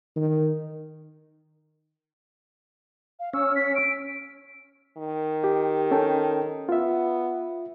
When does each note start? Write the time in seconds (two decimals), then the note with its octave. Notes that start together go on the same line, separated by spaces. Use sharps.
0.16 D#3
3.20 F5
3.33 C#4 E6
3.56 B6
3.75 D7
4.97 D#3
5.44 G4
5.91 C#4 A4 G5
6.69 B3 F4 E5